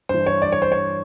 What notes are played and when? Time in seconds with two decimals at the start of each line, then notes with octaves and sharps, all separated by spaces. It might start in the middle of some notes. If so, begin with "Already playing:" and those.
0.09 G2 E3 C5
0.26 C#5
0.42 D5
0.52 C#5
0.62 C5
0.72 C#5